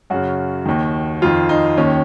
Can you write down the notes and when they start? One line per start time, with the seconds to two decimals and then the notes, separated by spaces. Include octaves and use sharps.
0.10 F#2 C#3 F#4
0.66 D#2 D#3
1.22 F2 D#3 F4
1.49 D#4
1.78 D#2 D#3 C#4